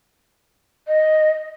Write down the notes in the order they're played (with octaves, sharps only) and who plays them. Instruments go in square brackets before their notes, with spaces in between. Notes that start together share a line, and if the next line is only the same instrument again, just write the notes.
[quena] D#5